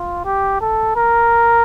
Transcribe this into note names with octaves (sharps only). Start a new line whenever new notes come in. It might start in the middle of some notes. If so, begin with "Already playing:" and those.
Already playing: F4
G4
A4
A#4